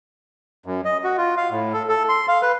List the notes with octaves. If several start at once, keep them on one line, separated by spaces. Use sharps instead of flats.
F#2
D#5
F#4
F4
F5
A2
A4
A4
C6
F5
B4